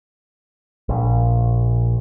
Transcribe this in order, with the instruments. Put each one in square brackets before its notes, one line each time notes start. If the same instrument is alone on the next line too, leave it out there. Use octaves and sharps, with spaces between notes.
[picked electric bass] A#1